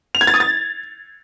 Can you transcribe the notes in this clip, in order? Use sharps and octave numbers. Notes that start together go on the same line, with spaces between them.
F7
G#6
A6
D#6
A6